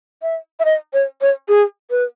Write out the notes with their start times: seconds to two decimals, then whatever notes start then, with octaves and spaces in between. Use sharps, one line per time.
0.22 E5
0.59 E5
0.65 D#5
0.93 C#5
1.21 C#5
1.48 G#4
1.90 B4